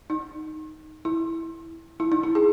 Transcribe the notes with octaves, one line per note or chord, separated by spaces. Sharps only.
D#4
E4
E4
D#4
E4
G#4